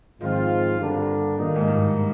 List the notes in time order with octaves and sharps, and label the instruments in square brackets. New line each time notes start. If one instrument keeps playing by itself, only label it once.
[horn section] G#2 F3 C4 F4 [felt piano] D#3
[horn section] G2 D3 G3 A#3 D4
[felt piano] A#2 [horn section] D#3 A#3 D#4
[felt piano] G#2
G2